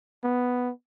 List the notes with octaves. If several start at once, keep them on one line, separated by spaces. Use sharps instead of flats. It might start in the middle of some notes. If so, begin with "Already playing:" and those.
B3